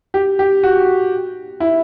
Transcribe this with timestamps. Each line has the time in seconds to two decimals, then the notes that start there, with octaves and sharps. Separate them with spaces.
0.14 G4
0.39 G4
0.63 F#4
1.60 E4